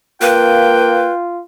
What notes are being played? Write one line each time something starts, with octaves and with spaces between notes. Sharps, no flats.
A#3 F4 B4 G5